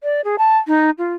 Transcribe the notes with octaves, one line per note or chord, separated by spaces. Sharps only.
D5
G#4
A5
D#4
F4